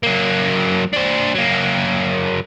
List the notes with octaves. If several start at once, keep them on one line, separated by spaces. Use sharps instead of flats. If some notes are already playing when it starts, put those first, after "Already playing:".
F#3 A#3
D4 C5
F#3 A#3